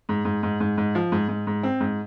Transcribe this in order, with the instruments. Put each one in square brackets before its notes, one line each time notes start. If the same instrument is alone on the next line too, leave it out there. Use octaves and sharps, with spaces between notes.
[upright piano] G#2
G#2
G#2
G#2
G#2
F3
G#2
G#2
G#2
C4
G#2